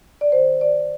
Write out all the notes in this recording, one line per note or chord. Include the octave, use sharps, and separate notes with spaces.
D5
D#3 C5
D5